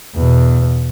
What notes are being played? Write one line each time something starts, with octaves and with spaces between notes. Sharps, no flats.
E2 B2